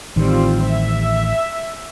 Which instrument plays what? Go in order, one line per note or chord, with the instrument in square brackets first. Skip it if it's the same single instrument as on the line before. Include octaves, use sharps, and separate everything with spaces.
[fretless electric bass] A1 D#3 [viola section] G3 C4 F4
[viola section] E5